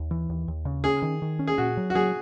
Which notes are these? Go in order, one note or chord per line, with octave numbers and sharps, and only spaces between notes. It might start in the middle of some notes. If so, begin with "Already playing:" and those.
Already playing: D#2
E3
D#2
D#2
C#3
C#4 G#4
D#3
D#3
C#4
G#4
A#2 F#4
F#3
F#4
F#3 G#4